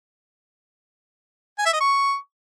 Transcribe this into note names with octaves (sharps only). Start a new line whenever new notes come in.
G#5
E5
D#5
C#6